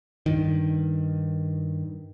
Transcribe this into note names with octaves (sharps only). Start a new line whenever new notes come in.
G2 D#3